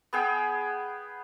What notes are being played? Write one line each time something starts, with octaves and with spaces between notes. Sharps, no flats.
B3 G#4 G5